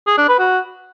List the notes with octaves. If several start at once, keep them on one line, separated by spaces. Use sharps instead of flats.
G#4
D4
B4
F#4